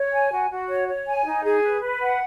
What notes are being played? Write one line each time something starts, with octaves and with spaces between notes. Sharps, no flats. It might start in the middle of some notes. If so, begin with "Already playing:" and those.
Already playing: C#5
G#5
F#4
F#4
C#5
C#5
G#5
D#4
G#4
B4
B4
F#5